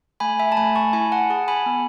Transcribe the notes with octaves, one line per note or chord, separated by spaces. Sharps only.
A3 G#5 B5
E5 G#5
A5
A3 G#5 B5
A5 C#6
E4 G#5 B5
F#5 A5
G#4 F#5 A5
G#5 B5
B3